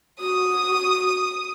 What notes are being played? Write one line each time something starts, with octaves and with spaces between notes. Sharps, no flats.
F#4 D#6